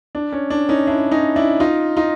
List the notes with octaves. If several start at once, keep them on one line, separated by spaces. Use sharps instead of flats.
D4
C#4
D4
C#4 D#4
D4 E4
C#4 D#4
D4 E4
D#4 F4
D#4 F4